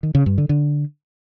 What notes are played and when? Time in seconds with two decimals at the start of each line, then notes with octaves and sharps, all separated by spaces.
0.03 D#3
0.15 C#3
0.26 G2
0.38 D3
0.49 D3